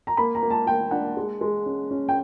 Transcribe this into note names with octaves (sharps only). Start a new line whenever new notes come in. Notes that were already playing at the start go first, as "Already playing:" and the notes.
A#5
A#3 B5
A#5
A#3
A5
A#3 G5
D4 F#5
G#3
G#3
C#4
C#4
G5